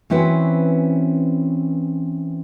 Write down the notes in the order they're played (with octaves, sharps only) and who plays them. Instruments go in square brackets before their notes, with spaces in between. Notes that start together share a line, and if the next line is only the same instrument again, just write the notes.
[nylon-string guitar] E3 C4 C#4 E4 F#4 B4